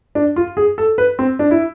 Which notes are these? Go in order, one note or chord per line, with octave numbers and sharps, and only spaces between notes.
D4
F4
G#4
A4
B4
C4
D4
E4